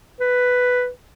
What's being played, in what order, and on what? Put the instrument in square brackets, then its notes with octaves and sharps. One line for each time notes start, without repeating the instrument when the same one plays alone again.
[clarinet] B4